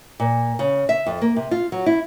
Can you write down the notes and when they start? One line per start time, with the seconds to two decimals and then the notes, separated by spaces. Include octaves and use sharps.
0.20 A#2
0.59 C#3
0.89 E5
1.06 F2
1.21 A#3
1.36 C3
1.51 F4
1.72 F#3
1.86 E4